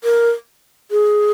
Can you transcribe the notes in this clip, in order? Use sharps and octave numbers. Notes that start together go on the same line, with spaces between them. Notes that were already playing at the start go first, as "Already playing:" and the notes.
A#4
G#4